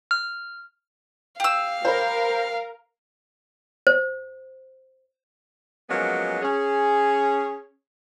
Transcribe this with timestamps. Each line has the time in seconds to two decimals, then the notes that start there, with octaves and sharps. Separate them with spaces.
0.11 F6
1.40 G4 F5 E6
1.85 A#4 C5 B5
3.87 C5
5.90 F3 F#3 G#3 A#3 B3 C#4
6.41 C#4 G#4